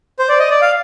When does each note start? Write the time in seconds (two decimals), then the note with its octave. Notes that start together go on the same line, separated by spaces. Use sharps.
0.19 C5
0.29 D5
0.40 D#5
0.51 D5
0.61 F5